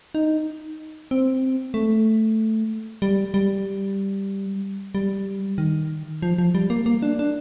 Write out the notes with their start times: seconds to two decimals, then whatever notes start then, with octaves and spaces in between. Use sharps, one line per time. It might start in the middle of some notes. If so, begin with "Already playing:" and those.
0.15 D#4
1.11 C4
1.74 A3
3.02 G3
3.34 G3
4.95 G3
5.58 D#3
6.22 F3
6.38 F3
6.55 G3
6.70 A#3
6.86 A#3
7.02 D4
7.19 D4